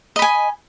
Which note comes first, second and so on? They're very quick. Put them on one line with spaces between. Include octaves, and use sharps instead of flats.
D#5 B5 G#5